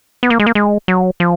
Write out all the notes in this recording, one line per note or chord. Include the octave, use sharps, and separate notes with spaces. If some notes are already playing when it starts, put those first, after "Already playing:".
B3
A#3
G#3
A#3
G#3
F#3
F3